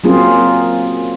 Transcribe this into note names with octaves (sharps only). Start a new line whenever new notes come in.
F#3 A#3 C4 C#4 F4 G#4